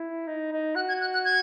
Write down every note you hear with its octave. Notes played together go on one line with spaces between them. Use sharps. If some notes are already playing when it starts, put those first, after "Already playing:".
Already playing: E4
D#4
D#4
F#4 F#6
G#6
F#6
F#6
G#6